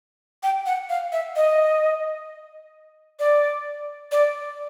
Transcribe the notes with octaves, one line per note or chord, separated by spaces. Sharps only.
G5
F#5
F5
E5
D#5
D5
D5